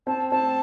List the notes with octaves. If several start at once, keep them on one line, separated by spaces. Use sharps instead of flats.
C4 A5
C4 A5